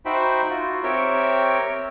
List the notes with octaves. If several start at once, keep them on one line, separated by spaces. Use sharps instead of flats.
D#4 F#4 C5 E5 G5 B5
F4 F#4
C4 G4 A#4 C#5 E5 G5